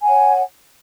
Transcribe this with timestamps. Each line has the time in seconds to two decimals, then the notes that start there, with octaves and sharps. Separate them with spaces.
0.01 G#5
0.04 F#5
0.08 C#5